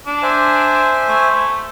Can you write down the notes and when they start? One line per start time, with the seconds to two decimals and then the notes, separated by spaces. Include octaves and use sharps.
0.06 D4
0.23 C5 E5 G#5
1.08 A3